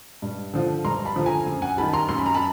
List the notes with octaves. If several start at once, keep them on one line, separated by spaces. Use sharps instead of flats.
G2
D3 F3
G2 A#5 C6
A5 B5
D3 F3
G#5 A#5
F#2
F#5 G#5
D#3 G3 A5 B5
A#5 C6
F#2 C6
B5
A#5
A5 B5